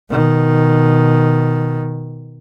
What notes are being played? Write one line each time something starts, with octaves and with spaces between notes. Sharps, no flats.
B2 D#3